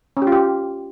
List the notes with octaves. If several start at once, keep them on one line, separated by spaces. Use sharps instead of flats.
C#4
G4
F4
G4